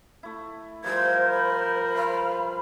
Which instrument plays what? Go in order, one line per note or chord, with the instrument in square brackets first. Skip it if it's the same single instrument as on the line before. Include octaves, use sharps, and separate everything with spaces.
[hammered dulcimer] A3 E4
[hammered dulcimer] F3 G3 G#3 [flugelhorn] A#4 [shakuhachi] C5 [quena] G#6
[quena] B5
[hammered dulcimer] B4 C5 [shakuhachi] F5